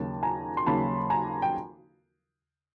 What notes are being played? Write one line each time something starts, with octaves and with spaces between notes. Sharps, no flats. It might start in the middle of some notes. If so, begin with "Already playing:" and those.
Already playing: D#2 C#3 F#3 A#3 A5
G#5 A#5
C6
D#2 C#3 F#3 A#3 A5 B5
G#5 A#5
G5